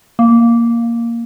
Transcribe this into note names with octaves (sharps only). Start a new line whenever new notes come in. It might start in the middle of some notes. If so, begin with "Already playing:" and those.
A#3